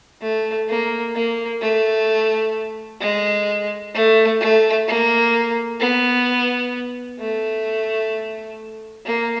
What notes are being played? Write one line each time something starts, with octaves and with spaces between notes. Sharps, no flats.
A3
A#3
A#3
A3
G#3
A3
A3
A#3
B3
A3
A#3